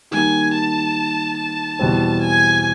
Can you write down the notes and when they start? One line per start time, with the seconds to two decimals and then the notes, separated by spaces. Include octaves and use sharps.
0.11 D#3 G3 A#3 G#5
0.54 A5
1.37 A5
1.79 E2 B2 G3 C4
2.22 G#5